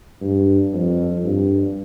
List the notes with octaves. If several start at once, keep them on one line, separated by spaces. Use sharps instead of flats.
G2
F2
G2